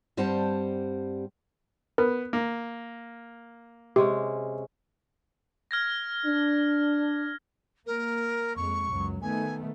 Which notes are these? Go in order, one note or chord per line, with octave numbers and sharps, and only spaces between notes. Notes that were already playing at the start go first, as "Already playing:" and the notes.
G2 G3 C4 C5 F#5 A5
B3 A#4
A#3
C3 G#3 C#4 G4
F6 G#6 A#6
D4
A#3 A#4
F2 G#3 C#6
C#2 F#2 F#3
D#3 A3 B3 G#5